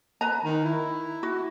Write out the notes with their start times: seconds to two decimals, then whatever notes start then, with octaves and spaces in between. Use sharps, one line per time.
0.21 B4 A#5
0.45 D#3
0.65 E4
1.23 F#4